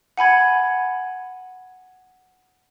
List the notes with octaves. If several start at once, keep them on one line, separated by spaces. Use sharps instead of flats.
F#5 G#5 B5 G#6